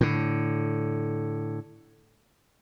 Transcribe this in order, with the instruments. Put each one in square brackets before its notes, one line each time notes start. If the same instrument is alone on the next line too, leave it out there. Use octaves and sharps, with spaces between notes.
[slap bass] A2 D3